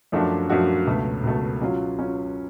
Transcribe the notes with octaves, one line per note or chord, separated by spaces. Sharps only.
F#2 F3 A3 D4 F#4
F#2 F3 A3 D4 F#4
C#2 B2 A3
C#2 B2 A3
F#3 C#4 F4
F#3 C#4 F4